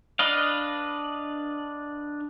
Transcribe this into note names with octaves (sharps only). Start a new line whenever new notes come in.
D4 B4 D#5 F5